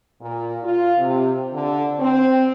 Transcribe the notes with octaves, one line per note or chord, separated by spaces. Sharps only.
A#2
F4
C3
D3
C4